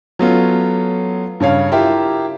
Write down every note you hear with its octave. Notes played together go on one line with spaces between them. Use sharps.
F#3 A3 B3 C#4 F4
G2 C#3 C#5 F5
E4 F4 G4 A#4 E5